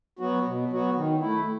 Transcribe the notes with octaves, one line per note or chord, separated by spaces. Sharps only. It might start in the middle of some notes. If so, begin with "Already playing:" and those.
F#3 B3 F#4
B2
F#3 B3 F#4
D#3
A3 E4